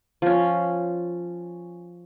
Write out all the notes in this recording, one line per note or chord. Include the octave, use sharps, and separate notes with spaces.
F3 C#4